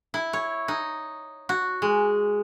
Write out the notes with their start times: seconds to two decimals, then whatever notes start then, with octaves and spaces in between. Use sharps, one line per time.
0.14 E4
0.33 C#5
0.68 D#4
1.49 F#4
1.82 G#3